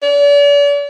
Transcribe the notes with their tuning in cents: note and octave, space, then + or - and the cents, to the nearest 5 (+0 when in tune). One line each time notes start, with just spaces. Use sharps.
D5 -40